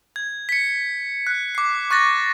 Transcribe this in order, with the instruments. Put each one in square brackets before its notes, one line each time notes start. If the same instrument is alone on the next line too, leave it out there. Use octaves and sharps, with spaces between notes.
[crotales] G#6
B6 C#7
F#6
D6 C7
C#6 F#6 A6 A#6